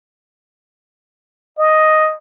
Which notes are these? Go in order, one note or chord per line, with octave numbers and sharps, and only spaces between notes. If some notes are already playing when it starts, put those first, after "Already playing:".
D#5